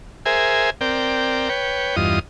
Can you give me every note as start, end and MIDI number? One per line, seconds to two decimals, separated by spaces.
0.26 0.70 68
0.26 0.70 70
0.26 0.70 72
0.26 0.70 76
0.26 0.70 80
0.81 1.49 60
0.81 1.49 70
0.81 1.49 74
0.81 1.49 79
1.49 1.96 71
1.49 1.96 73
1.49 1.96 79
1.96 2.19 40
1.96 2.19 43
1.96 2.19 65
1.96 2.19 75
1.96 2.19 87